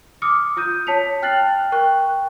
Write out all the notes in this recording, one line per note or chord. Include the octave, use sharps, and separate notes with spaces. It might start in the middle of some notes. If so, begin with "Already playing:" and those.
D6 D#6 F6 C#7
F4 D#6 G6 D#7
C#5 A5 B6 C#7 F7
G5 F6 F#6 A6 C7 F#7
A#4 G5 C#6 F#6